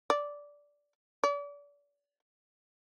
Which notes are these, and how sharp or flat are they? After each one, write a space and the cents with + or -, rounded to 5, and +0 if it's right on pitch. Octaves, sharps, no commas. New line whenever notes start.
D5 -10
D5 -35